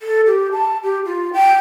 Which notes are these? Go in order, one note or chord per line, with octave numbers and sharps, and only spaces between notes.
A4
G4
A5
G4
F4
G5